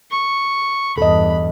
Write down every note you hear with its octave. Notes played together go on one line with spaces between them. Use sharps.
C#6
E2 G2 A4 D#5 B5